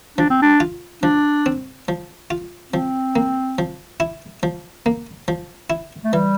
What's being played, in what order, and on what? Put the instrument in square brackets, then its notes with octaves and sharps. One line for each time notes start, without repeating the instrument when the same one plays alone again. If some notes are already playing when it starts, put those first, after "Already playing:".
[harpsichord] F3 [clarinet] D4
[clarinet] C4
D4
[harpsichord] F4
[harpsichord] F3 [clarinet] D4
[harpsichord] C4
F3
F4
[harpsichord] F3 [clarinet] C4
[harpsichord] A#3
F3
E4
F3
A#3
F3
E4
[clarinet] A3
[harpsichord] E3 [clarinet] G3